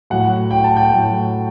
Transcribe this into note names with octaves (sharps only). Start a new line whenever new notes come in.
A2 F#3 F#5
G5
A5
G5
A2 F#3